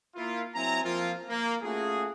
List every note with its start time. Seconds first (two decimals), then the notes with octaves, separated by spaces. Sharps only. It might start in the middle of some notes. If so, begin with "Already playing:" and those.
0.16 A#3 E4 F4
0.55 F#3 C4 E4 G#5 A#5
0.84 F3 A#3 C4 F4
1.29 A#3
1.63 A3 C#4 F4 F#4 G#4